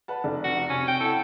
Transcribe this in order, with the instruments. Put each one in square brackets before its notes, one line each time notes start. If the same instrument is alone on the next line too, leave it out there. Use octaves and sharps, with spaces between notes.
[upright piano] B4 F#5 A5
F1 D5
[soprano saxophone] F#4
[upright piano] C3 [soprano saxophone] C#4
[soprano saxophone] G5
[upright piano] E4 F#5 [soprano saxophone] A4